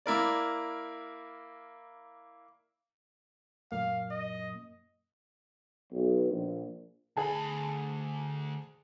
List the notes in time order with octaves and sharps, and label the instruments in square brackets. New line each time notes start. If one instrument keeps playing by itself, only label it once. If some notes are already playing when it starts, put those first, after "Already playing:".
[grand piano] A#3 E4 A#4 D5
[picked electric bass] F#2 A#2 A#3 [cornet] F5
[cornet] D#5
[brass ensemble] B1
A#1
[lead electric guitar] D2 B5 [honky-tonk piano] G#4 A5